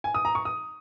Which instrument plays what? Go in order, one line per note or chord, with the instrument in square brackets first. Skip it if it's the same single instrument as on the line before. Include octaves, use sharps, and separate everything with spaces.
[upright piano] G#5
D#6
A#5
C#6
D#6